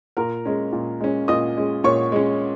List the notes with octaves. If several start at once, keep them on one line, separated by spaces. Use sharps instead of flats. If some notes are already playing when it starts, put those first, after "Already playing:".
A#2 A#4 A#5
G#3 C#4
A#2
G#3 C#4
A#2 D#5 D#6
G#3 C#4
A#2 C#5 C#6
G#3 C#4